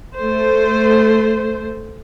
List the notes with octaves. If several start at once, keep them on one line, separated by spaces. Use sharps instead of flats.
A3 C5